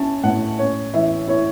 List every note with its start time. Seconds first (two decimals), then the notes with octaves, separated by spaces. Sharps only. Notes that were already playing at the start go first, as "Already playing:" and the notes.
Already playing: C#4 E4 A5
0.23 A2 F#5
0.59 C#4 C#5
0.94 E3 E5
1.27 E4 C#5